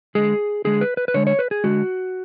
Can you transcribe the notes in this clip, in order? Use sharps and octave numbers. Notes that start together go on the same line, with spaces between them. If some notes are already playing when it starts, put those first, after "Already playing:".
D3 G#3 G#4
D3 G#3 G#4
B4
B4
B4
D3 G#3 C#5
C#5
B4
G#4
D3 G#3 F#4